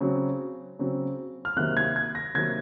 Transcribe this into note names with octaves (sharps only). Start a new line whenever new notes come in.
C#3 F#3 C4
C#3 F#3 C4
F6
C3 D#3 F#3 A#3 F#6
G#6
G#6
A#6
C3 D#3 F#3 A#3 G#6